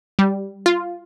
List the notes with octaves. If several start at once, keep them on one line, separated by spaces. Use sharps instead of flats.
G3
F4